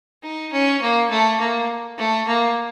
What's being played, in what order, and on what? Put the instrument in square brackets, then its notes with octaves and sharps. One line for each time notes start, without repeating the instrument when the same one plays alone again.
[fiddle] D#4
C#4
A#3
A3
A#3
A3
A#3